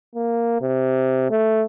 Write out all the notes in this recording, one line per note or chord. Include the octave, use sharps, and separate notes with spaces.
A#3
C3
A3